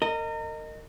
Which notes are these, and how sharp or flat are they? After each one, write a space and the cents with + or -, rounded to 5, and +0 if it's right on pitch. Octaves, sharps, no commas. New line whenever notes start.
A#4 -30 D#5 -10